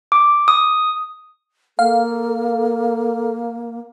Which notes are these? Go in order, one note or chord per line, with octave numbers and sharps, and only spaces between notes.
D6
D#6
A#3 A4 F5